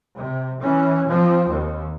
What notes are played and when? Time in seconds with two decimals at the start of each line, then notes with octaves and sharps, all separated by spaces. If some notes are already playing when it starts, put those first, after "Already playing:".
0.15 C3
0.61 E3 C#4
1.09 F3 C4
1.49 D#2